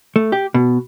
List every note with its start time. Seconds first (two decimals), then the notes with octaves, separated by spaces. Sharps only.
0.16 A3
0.32 G4
0.54 B2